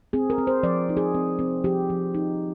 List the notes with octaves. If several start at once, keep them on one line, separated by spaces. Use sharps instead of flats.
C4 G#4
A#4
C4
C5
F3 D5
D#4
G#4
C4
C4
F3 G4
F3
D#4